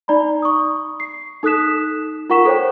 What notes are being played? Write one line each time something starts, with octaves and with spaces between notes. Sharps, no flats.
D#4 D5 A#5 B5
C#6 D#6
C7
D#4 A4 D#6 F#6 B6 E7
F4 A#4 F#5 C#6 B6 E7
A4 C5 C#5 G5